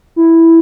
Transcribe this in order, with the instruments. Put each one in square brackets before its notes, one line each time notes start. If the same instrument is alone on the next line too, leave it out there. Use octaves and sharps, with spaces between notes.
[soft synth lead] E4